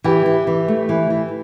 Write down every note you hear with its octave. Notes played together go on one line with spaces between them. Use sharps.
E3 G4
E3
E3
A3
E3
E3